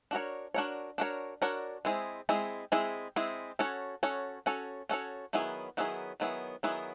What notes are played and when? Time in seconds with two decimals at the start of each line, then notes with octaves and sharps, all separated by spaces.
0.11 D4 F#4 A#4 C#5
0.54 D4 F#4 A#4 C#5
0.98 D4 F#4 A#4 C#5
1.42 D4 F#4 A#4 C#5
1.85 G#3 C4 E4 G#4
2.29 G#3 C4 E4 G#4
2.72 G#3 C4 E4 G#4
3.16 G#3 C4 E4 G#4
3.59 C#4 F#4 A4 C#5
4.03 C#4 F#4 A4 C#5
4.46 C#4 F#4 A4 C#5
4.89 C#4 F#4 A4 C#5
5.33 D#3 F#3 B3 E4 G#4
5.77 D#3 F#3 B3 E4 G#4
6.20 D#3 F#3 B3 E4 G#4
6.63 D#3 F#3 B3 E4 G#4